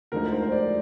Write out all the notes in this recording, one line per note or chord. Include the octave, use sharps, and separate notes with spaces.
D2 D3 F3 G#3 D#4 A#4
A#4
C5
C5
D5